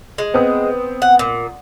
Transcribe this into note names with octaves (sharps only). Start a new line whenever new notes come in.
G#3
B3 C4 D#6
F#5
A#2